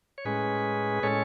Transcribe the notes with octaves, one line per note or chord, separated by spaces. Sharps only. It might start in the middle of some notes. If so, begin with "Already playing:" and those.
C#5
A2 G#3 C#4 G#4 B4
A2 G#3 C#4 A4 C#5